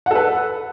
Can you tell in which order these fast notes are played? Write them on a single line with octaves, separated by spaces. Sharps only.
F#5 A4 B4